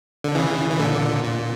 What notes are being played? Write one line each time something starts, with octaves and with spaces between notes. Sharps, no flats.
D3
C#3 E3
E3
A#2 D3
A#2